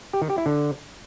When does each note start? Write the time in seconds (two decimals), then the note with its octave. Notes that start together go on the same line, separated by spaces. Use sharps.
0.13 G4
0.22 D#3
0.30 G4
0.38 E4
0.46 D3